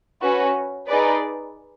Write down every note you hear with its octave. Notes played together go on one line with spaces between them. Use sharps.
C#4 F#4 B4
D#4 G#4 B4 D5